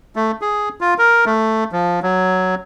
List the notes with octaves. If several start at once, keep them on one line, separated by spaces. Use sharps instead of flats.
A3
G#4
F4
A#4
A3
F3
F#3